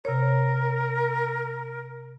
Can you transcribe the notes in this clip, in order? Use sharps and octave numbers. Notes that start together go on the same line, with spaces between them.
C3 A#4 C#5